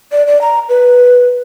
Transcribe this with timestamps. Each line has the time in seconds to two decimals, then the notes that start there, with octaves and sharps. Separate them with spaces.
0.12 D5
0.27 D5
0.41 A#5
0.69 B4